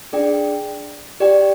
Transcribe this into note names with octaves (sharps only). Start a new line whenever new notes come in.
D4 G#4 D5 G5
G4 D5 G5